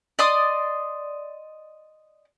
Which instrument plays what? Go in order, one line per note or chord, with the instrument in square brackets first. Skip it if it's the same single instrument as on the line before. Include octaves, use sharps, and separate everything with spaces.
[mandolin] D5 D#5 C6 D#6